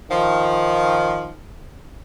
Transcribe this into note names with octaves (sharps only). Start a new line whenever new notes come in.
D#3 F3